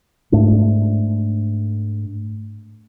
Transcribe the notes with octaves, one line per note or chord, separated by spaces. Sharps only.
G#2 A3 D4